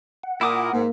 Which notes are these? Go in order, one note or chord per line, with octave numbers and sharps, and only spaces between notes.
F#5
A#2 E4 A#4 D6 D#6
G#2 A#3